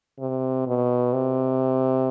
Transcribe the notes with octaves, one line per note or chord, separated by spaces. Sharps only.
C3
B2
C3